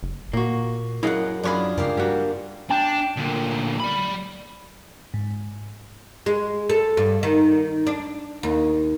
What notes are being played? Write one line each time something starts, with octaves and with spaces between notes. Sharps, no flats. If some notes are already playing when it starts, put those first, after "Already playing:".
F#1
A#2 A#3 F#4
F#2 E4 G#4 D#5 F5 F#5
F#2 D4 F4 G#4 C#5 B5
C#2 G2 A#3 G4 F5
G3 F#4
D4 G5
D2 A#2
D5 B5
G#2
G#3
A4
G2
D#3
D4
D#2